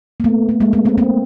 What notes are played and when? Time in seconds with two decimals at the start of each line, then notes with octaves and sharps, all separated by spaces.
0.20 A#3
0.24 A3 B3
0.49 A3
0.60 G#3 A#3
0.73 A3 B3
0.85 A#3 C4
0.98 A#3 C4